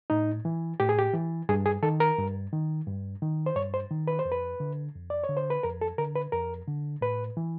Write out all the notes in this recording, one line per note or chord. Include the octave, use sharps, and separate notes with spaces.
A2 D#4
E3
A2 G4
G#4
G4
E3
G2 G#4
G#4
D#3 A4
A#4
G2
D#3
G2
D#3
C5
G2 C#5
C5
D#3
B4
C5
F2
B4
D3
F2
D5
C#5
D3
C5
B4
F2 A#4
A4
D3 A#4
B4
F2 A#4
D3
A2 B4
E3